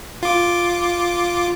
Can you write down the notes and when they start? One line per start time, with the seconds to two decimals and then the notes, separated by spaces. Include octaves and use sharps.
0.23 F4 D6